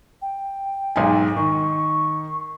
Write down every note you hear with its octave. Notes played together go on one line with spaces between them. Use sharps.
G5
B1 G#2 G#5
D#3 C#6